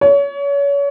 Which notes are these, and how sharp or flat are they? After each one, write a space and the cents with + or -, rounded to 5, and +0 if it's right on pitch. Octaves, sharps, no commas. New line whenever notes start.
C#5 +30